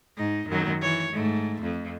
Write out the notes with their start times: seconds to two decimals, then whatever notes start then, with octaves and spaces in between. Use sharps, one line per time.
0.16 G#2 D#4
0.47 F#2 D#3 F#3
0.81 E3 C#5
1.13 G#2 A3
1.62 F2